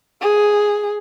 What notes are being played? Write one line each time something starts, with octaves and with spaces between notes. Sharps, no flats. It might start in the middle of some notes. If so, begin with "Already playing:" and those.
G#4